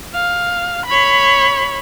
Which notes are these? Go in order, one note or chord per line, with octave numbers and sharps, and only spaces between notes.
F5
C#5 B5